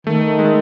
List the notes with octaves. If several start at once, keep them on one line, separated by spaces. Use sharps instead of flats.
D#3 A3
G#3
A3